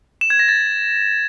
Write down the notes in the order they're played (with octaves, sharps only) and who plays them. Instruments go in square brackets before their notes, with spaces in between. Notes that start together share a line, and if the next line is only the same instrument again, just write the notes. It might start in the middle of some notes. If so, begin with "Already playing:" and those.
[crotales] E7
G#6
A#6
A6